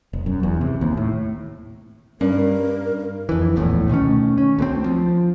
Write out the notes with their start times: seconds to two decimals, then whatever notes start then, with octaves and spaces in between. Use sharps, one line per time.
0.13 E1
0.26 F#2
0.43 E2
0.61 C3
0.81 D#2
0.97 A2
2.21 G2 C#4 A#4
3.29 F2 E3
3.56 D1 A#1 E2 A2
3.89 B2 D#3 A3 C#4
4.38 C#4
4.59 D2 A3 C4
4.86 F3